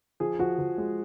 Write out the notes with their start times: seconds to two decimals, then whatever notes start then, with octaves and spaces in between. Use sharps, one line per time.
0.20 F3 G#4
0.39 F3 F#4
0.59 F3
0.78 G#3